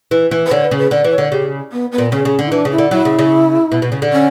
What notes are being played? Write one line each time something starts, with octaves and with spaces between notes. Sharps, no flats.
E3
E3
B4
D3 C#5
B4
C#3
B4
D3 D5
E3
C#5
D3
C#3 G4
B3
B3
A#2
C#3 C#4
C#3
D3
E4
E3 D4
C#3
E4
D3
F#3 E4
C#3
C#3
B2
B2
C#3
D3
C#4